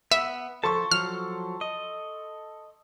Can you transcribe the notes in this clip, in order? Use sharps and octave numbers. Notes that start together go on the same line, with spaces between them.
B3 E5
F3 A4 A5 C6 C#6
F3 F#3 F6
D#5